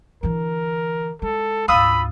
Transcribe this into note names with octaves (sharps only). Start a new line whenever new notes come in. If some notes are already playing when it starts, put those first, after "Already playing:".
D3 E3 A#4
G#3 A4
D2 G#2 F4 B5 D#6 E6